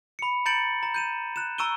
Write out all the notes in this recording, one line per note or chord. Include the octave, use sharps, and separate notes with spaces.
B5 C#7
A#5 G6 A6 C#7 D7 F#7
A#5
G6 D#7 E7
F#6 E7
A#5 C#6 E6 D7 D#7 G7